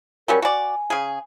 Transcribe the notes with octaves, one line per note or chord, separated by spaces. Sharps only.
F#3 G3 C#4 A#4
F#4 D5 G#5
C#3 G#4